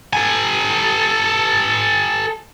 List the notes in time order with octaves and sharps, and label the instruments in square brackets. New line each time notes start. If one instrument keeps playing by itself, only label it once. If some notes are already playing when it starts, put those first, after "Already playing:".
[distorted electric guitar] A4 G#5